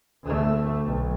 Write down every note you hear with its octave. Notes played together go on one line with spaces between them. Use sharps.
D2 A3
B1